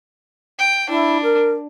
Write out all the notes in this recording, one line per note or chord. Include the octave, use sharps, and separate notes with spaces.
G5
D4 E4
A#4